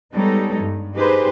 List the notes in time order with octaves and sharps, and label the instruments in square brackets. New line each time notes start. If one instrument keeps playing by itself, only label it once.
[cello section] G3 G#3 B3 D#4 A4 C#5
G2
D#4 G4 G#4 B4 C5